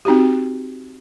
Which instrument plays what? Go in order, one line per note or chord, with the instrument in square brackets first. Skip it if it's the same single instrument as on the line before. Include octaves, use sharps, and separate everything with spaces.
[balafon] C4 D#4 F#4 G4